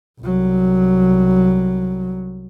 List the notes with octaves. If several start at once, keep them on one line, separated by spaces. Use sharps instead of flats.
C2 F#3